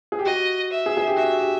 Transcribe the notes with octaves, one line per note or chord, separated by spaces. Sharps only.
G#4
G4
F#4 D#5
E5
G#4
G#4
G4
F#4 E5
G4